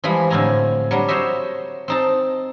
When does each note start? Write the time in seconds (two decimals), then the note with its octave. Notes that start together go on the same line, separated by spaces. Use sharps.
0.04 E3 F3 G3 G#3 B5
0.30 A2 D3 C4 G#5 A#5
0.91 F#3 G3 D4
1.08 F#4 C5 C#5 D#5 E5
1.88 C4 D#4 A5